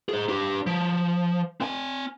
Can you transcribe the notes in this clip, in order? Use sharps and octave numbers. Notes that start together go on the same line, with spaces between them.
G#4 C5
D4 G4
F3
C4 G#5